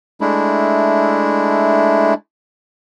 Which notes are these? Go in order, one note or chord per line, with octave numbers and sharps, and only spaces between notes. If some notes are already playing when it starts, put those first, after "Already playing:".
G#3 A3 D4 E4